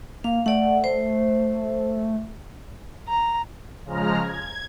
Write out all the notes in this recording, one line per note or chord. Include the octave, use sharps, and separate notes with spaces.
A#3 F5
A3 D5 F#5
C5
A#5
C#3 F3 G#3 A#5 F6
G#6